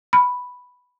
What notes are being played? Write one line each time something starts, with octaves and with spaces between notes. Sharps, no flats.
B5